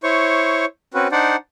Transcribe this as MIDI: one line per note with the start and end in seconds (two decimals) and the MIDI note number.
0.04 0.65 64
0.04 0.65 72
0.04 0.65 73
0.04 0.65 85
0.94 1.08 60
0.94 1.08 61
0.94 1.08 66
0.94 1.08 71
1.12 1.36 62
1.12 1.36 63
1.12 1.36 72
1.12 1.36 74
1.12 1.36 78